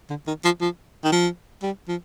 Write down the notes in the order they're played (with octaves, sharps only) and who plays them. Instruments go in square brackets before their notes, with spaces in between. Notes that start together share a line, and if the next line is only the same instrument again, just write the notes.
[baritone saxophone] D3
D#3
F3
F3
D#3
F3
G3
F3